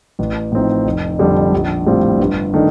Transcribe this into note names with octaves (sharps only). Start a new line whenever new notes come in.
A1
A2 F3 C4 D#4
F1
F2 D3 G3
A#1
A2 G3 C4 F4
G1
D#3 A3 D4